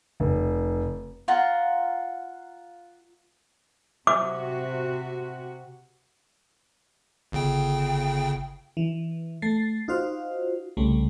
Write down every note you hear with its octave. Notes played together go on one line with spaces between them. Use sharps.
F1
F4 F#5 A#5
C3 F#4 E5 D6
G1 C#3 G5
E3
A3 A6 C7
D#4 F4 F#4 C5 F5
C2 C#3 G3 A3